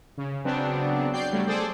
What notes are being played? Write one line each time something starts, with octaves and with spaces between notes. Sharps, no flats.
C#3
C#3 F#3 B3 C4 D4
F#3 D5 G5 G6 C7
F#3 G3 A3
G#4 A4 C5 D5 G5